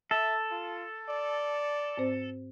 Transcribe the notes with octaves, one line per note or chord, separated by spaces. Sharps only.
A4 E5
F4
D5
G#2 C4 C5